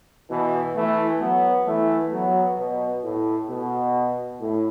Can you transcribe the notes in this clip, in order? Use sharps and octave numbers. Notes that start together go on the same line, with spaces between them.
B2 E3
E3 A3
F#3 B3
E3 A3
F#3 B3
B2
A2
B2
A2